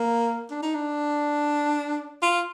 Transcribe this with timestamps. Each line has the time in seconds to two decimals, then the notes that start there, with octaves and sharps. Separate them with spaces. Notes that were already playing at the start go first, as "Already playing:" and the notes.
Already playing: A#3
0.51 D4
0.63 D#4
0.75 D4
2.22 F4